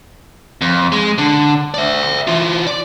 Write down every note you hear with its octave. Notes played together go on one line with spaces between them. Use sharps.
F2
G#3
D3
D5 E5
E3 F4
D5